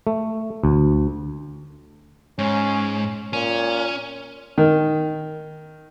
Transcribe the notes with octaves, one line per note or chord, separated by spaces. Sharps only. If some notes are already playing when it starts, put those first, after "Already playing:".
A3
D2
G#2 C#4
A#2 C#4
D#3